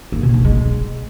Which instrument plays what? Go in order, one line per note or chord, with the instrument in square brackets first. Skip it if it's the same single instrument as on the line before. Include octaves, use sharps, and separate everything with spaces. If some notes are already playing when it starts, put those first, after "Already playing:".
[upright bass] A#3
B2
A#3
G#3